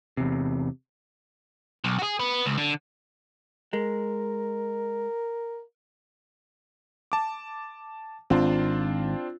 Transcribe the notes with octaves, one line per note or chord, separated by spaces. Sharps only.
E2 C3
B1
F#4 G#4
B3
C#2
D3
G#3 A#4
A5 D6
G#1 C4 D4 F4